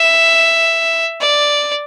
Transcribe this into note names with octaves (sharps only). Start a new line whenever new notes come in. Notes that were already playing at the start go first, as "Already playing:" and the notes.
Already playing: E5
D5